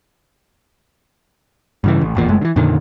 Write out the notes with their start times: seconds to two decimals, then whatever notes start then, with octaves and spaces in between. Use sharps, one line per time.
1.84 G2 C#3 E3
2.01 A1
2.15 G#1 E2 A#2
2.28 F#1 F#2 G#3 A3
2.41 D3 E3
2.56 F2 A#2 D3 D#3